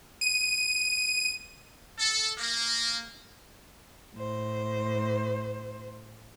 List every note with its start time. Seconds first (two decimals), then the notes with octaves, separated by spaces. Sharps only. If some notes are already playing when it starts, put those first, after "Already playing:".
0.21 D#7
1.99 A4
2.37 A#3
4.13 A2 C5